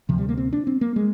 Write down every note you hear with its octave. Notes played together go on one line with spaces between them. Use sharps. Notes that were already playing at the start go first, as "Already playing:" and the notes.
D2 C3 F3
G3
A#3
C4
D4
C4
A#3
G#3